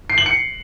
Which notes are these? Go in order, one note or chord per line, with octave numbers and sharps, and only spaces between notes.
C7
F#7
C#7